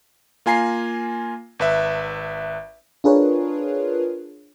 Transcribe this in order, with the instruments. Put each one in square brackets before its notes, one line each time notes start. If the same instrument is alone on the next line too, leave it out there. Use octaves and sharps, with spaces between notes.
[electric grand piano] A#3 F4 G#5 A#5 C7
G#1 B4 E5
[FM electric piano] D4 F4 G#4 A#4 B4 C#5